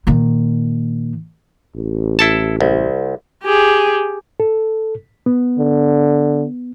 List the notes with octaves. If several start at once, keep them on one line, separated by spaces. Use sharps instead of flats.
A#2 D#3
A1
E4 A4 A5
C2
G4 G#4
A4
B3
D3